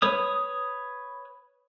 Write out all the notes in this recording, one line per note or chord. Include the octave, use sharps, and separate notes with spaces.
B4 C#5 D#6